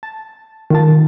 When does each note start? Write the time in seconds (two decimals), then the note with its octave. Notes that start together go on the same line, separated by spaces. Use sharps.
0.03 A5
0.70 D#3 F4 A5